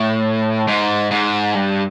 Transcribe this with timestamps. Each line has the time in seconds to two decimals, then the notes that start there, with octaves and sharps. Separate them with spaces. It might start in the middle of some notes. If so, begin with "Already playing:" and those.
Already playing: A2
0.68 G#2
1.11 G#2
1.54 G2